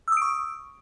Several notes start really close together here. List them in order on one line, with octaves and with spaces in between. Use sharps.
E6 D#6 D7 C#6